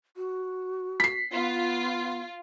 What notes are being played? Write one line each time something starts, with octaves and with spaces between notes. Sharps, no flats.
F#4
B6 C7
B3 F4